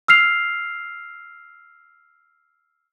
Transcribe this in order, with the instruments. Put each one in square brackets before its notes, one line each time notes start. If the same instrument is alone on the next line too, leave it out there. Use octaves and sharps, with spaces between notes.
[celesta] E6 F6 C7 F7